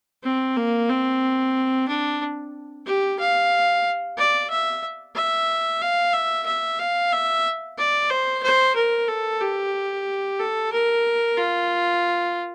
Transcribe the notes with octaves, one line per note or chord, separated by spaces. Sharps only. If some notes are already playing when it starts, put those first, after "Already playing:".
C4
A#3
C4
D4
G4
F5
D5
E5
E5
F5
E5
E5
F5
E5
D5
C5
C5
A#4
A4
G4
A4
A#4
F4